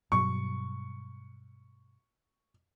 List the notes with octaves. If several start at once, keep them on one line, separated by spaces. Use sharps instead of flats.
G2 B2 F#3 C#6